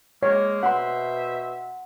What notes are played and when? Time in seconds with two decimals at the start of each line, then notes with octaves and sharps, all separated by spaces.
0.23 G#3 A#3 C#5
0.63 B2 C5 E5 F#5 C6